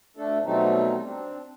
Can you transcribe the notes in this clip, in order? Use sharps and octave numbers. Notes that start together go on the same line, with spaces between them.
D2 A3 D4 A4
B2 F#3 G3 A3 C4 D#4
C4 D4